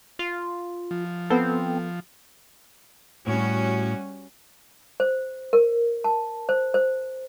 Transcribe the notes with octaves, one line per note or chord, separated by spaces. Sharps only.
F4
F3
B3 C4 A4
A2 G3 C#4 F#4
C5
A#4
A5
C5
C5